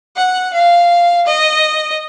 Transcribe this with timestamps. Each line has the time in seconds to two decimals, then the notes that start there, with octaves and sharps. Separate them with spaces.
0.16 F#5
0.54 F5
1.27 D#5